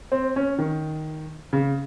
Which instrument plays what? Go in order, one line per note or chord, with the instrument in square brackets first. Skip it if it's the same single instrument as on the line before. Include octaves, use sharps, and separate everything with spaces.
[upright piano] C4
C#4
D#3
C#3